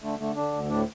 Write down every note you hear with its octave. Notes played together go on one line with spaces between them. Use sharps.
D3 A3
D3 A3
D3 D4
D2
A2 D4